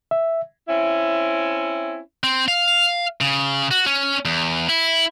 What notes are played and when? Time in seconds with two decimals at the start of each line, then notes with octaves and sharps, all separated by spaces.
0.11 E5
0.69 C4 C#4 E4
2.24 C4
2.48 F5
3.21 C#3
3.71 F#4
3.86 C#4
4.25 E2
4.69 E4